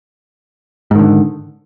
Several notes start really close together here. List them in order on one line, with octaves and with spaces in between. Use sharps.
G#2 D#3 D3